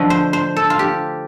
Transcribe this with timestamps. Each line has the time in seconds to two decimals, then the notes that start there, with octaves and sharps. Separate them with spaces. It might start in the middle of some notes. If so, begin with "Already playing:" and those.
Already playing: D3 F3 A3 D#5
0.10 C5
0.33 C5
0.56 A4
0.70 F4
0.79 G4